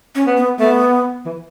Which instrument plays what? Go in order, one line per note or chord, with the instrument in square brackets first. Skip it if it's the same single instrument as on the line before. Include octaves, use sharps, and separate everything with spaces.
[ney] C#4
[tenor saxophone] B3
[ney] B3
[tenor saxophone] A3 [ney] B3
[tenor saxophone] E3